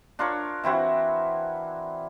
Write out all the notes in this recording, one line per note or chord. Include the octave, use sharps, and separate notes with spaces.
D4 F4 A#4 C#5
E3 C4 E4 F#4